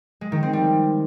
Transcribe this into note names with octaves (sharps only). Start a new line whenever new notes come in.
G#3
D#3
C4
G3